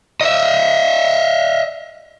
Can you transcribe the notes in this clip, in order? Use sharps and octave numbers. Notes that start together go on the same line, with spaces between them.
D#5 E5